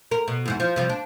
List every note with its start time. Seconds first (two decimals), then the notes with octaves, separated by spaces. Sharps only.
0.11 A#4
0.28 B2
0.46 E2 G#2 F#4
0.60 F3
0.76 C3 F3 G3
0.89 D4